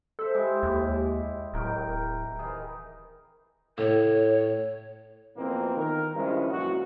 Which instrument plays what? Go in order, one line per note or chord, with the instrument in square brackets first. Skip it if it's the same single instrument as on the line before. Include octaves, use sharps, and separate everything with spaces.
[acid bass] A4 [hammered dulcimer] C5 E5
[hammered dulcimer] G#3 E4 G4
[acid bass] D#2
[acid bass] D1 [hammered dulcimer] A#4 G5
[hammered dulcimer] D#3 E3 G#4
[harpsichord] A2 [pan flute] C#5
[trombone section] F2 B2 E3 A#3 C4 F4
D#3 A#4
G2 C#3 F3 G#3 C#4 E4
A#1 F#2 E3 F3 F#4